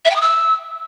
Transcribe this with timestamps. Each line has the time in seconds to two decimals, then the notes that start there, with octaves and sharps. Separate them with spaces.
0.05 E5
0.10 G5
0.16 D#6
0.21 E6